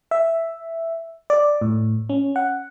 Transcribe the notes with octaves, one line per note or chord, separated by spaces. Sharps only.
E5
D5
A2
C#4
F#5